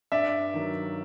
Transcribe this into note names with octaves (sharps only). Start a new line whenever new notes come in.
G2 D5 E5
D#3 F#3